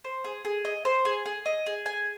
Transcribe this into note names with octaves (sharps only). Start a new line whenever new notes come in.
C5
G#4
G#4
D#5
C5
G#4
G#4
D#5
G#4
G#5